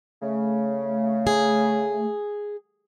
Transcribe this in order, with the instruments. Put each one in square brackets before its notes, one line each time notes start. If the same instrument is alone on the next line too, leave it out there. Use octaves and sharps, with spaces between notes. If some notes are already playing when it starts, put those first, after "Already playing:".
[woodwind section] C#3 [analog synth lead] A3
[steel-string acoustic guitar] G#4